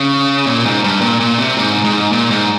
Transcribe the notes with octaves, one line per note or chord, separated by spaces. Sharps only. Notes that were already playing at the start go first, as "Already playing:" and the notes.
Already playing: C#3
A#2
G#2
G2
A#2
A#2
C3
G#2
G#2
A#2
G#2